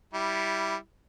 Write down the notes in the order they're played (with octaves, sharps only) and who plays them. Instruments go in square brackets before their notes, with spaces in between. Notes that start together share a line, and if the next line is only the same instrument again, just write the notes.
[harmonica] G3 E4